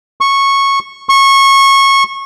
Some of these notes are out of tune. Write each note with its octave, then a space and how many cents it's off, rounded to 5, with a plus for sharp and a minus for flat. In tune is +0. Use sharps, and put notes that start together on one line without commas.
C#6 -10
C#6 -20